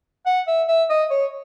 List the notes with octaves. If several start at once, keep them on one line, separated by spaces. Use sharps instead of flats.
F#5
E5
E5
D#5
C#5